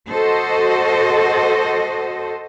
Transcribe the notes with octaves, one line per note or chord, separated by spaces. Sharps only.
F#4 A4 C5 D#5